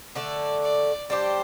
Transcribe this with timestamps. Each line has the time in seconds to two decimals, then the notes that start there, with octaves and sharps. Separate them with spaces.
0.15 D3 A3 D4 D5
0.63 D5
1.10 G3 D4 G4 C5